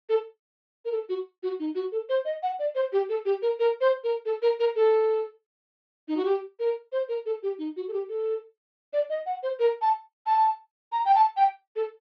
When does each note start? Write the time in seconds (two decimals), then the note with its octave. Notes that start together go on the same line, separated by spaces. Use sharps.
0.09 A4
0.85 A#4
0.92 A4
1.09 F#4
1.43 F#4
1.60 D#4
1.75 F#4
1.92 A4
2.09 C5
2.25 D#5
2.43 F#5
2.59 D5
2.75 C5
2.93 G4
3.09 A4
3.25 G4
3.42 A#4
3.59 A#4
3.81 C5
4.04 A#4
4.26 A4
4.42 A#4
4.59 A#4
4.76 A4
6.08 D#4
6.17 F#4
6.25 G4
6.59 A#4
6.92 C5
7.09 A#4
7.26 A4
7.43 G4
7.59 D#4
7.76 F#4
7.88 A4
7.93 G4
8.09 A4
8.93 D5
9.10 D#5
9.26 F#5
9.43 C5
9.59 A#4
9.82 A5
10.26 A5
10.92 A#5
11.05 G5
11.15 A5
11.37 G5
11.76 A4